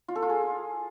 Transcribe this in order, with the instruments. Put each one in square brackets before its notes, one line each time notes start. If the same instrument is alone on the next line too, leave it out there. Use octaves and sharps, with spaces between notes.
[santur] F4
A4
F4
G#4